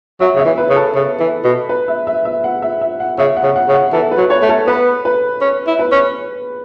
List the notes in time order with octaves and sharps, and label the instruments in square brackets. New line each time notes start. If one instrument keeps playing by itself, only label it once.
[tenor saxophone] F#3 [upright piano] E5
[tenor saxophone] C#3 [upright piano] E5
[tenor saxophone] E3
[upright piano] B4
[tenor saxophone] C#3
[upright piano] A4
[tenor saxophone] C#3
E3
B2
[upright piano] B4
E5
E5
E5
F#5
E5
E5
F#5
[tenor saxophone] C#3 [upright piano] E5
[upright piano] F#5
[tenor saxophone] C#3
[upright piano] F#5
[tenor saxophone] C#3
[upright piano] F#5
[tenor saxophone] E3 [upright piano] A4
[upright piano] B4
[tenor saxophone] F#3
[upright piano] C#5
[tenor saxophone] A3
[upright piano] A4
[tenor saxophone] B3 [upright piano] B4
[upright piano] B4
[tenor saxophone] C#4
E4
[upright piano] B4
[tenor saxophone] C#4